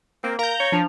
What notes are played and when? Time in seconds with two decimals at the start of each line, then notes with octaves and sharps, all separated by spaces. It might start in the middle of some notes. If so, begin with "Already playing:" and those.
0.24 A#3 C4
0.39 A#4 F5 A#5 G6
0.60 C#5
0.72 F3 D4 A5 F7